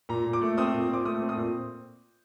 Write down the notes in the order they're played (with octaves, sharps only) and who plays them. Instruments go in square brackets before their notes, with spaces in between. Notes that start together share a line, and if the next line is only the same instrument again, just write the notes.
[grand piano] A#2 A#5
A#2
D6
A3
C4 D#6
A#2
A#2 D6
A3 D#6
C4
D#6
A#2